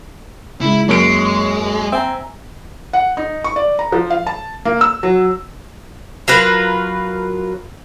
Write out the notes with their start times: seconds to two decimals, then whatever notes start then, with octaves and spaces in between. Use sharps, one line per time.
0.61 C#3 G#3 E4
0.89 F#2 G#3 A#3 C#5 D7
1.92 C4 E5 G#5 A#5
2.93 F#5
3.17 D#4
3.44 C#6
3.56 D5
3.79 A#5
3.92 F3
4.10 F5
4.27 A5
4.65 A#3
4.81 E6
5.03 F#3
6.28 F#3 F4 A#4 B4